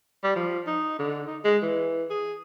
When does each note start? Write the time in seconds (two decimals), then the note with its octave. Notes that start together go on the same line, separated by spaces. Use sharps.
0.24 G3
0.36 F3
0.66 D#4
0.99 D3
1.27 D#4
1.44 G#3
1.62 E3
2.10 G#4